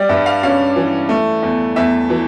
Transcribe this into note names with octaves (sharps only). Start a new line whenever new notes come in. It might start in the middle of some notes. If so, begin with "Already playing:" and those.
Already playing: G3 D5
G2 E5
F5
C#4 F5
E3
A3
E2
E2 E5
E3